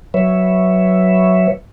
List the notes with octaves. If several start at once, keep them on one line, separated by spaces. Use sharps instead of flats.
F#3 B4 C#5 E5